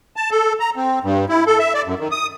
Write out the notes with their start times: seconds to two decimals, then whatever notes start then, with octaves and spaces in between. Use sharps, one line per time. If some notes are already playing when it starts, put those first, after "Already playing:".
0.16 A5
0.31 A4
0.60 A#5
0.76 C4
1.04 G2
1.29 E4
1.47 A4
1.59 E5
1.74 D5
1.86 F#2
2.00 D#3
2.11 D#6